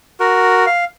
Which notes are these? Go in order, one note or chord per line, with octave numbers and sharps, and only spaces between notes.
F#4 A#4
F5